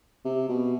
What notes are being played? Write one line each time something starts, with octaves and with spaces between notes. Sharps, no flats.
C3
B2